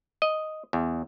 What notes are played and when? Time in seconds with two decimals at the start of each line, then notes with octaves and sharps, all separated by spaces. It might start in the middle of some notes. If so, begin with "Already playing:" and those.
0.22 D#5
0.73 E2